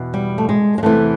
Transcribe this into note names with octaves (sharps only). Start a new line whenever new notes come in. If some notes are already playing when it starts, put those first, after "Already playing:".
Already playing: E2 B2
G3
A3
G#3
G#3
E2 C3 E3 A3